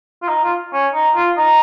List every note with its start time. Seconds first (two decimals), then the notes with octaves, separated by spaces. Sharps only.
0.22 F4
0.29 D#4
0.44 F4
0.73 C#4
0.93 D#4
1.15 F4
1.38 D#4